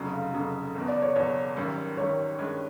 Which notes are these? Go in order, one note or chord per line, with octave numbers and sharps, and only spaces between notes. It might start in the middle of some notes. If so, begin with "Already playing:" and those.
Already playing: F1 F2 C#3 F#3
F5
F1 F2 C#3 F#3
F#1 E2 B2
D5
C#5
F#1 E2 B2 C#5
G#1 F#2 D#3 G3
G#1 F#2 D#3 G3 C#5
G2 D#3 G#3 C#4